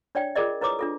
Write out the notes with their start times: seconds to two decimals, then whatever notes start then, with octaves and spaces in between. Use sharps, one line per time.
0.15 D4 C#5 D5 G5 G#5
0.35 F4 G#4 A#4 D5 D#5
0.61 E4 B4 C#5 D6 D#6
0.79 D4 F4 A4